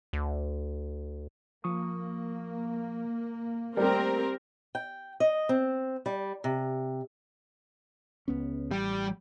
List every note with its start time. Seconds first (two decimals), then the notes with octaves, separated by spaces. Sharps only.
0.13 D2
1.64 F3 A#3 C#6 D#6
3.77 G3 A3 C4 G4 A#4
4.75 G5
5.20 D#5
5.49 C4
6.06 G3
6.44 C3
8.28 C#2 B3 C#4
8.71 A1 G3